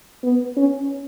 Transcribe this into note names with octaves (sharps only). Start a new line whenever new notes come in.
B3
C#4